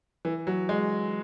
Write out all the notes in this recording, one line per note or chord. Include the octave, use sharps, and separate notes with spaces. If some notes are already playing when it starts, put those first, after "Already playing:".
E3
F#3
G#3